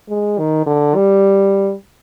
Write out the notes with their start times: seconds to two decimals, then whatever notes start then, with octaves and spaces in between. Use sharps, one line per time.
0.09 G#3
0.38 D#3
0.66 D3
0.95 G3